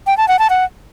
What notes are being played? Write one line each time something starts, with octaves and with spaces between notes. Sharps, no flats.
G5
A5
F#5
A5
F#5